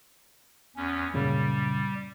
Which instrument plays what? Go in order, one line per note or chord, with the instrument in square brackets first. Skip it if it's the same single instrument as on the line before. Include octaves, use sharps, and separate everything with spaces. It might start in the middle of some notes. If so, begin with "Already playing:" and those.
[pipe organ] E2 C#4
[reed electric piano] F#2 A#2 C#3 [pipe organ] G3